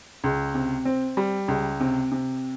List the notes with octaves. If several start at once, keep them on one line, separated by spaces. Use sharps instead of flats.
C#2
C3
C4
G3
C#2
C3
C3